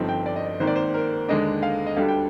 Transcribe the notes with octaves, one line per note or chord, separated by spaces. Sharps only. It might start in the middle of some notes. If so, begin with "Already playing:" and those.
Already playing: G1 G2 F3 C4 D#4
G5
D5
D#5
D5
G#1 G#2 D#3 A#3 C5
D5
C5
A#4
D#2 D3 G#3 D4 D#5
F5
D#5
D2 D3 G3 D4 F5
G5